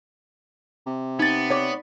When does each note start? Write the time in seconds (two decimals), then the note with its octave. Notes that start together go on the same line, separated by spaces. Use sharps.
0.86 C3
1.19 B3 D#4 A6
1.50 C#5 D5